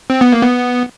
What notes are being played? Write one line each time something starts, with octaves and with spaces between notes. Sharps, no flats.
C4
B3
A#3
B3